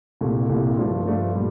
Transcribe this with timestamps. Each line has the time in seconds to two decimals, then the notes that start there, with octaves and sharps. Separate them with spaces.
0.21 C2 A#2 A3
0.49 C2 A#2 A3
0.77 G2 F3 A3 D4 F4
1.06 G2 F3 A3 D4 F4
1.35 A#2 G3